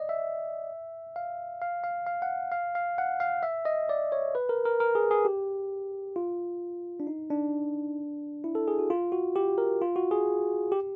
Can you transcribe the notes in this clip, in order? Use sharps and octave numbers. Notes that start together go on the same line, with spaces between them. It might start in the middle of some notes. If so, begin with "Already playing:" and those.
Already playing: D5 D#5
E5
F5
F5
F5
F5
F#5
F5
F5
F#5
F5
E5
D#5
D5
C#5
B4
A#4
A#4
A#4
G#4
G#4
G4
F4
D4
D#4
D4
E4
A4
G#4
F#4
F4
F#4
G4
A#4
F4
F#4
G#4
G4